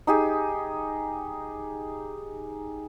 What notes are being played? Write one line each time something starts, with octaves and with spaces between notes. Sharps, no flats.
D#4 G4 G#4